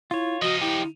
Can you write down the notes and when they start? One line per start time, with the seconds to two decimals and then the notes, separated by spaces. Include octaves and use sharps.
0.11 E4 F4 C#5
0.42 F3 D#4 F#4 D#5
0.61 E4 G4